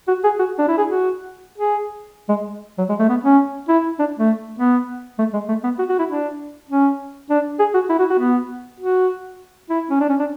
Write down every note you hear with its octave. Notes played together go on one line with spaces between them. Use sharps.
F#4
G#4
F#4
D4
E4
G#4
F#4
G#4
G#3
F#3
G#3
A3
B3
C#4
E4
D4
A3
B3
A3
G#3
A3
B3
F#4
F#4
E4
D4
C#4
D4
G#4
F#4
E4
F#4
F#4
B3
F#4
E4
C#4
D4
C#4
D4